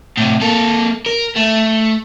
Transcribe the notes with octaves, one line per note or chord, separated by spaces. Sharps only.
A2 C3
A#3 A4
A#4
A3